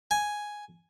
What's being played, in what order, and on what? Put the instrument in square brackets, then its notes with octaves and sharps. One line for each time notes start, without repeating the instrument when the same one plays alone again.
[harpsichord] G#5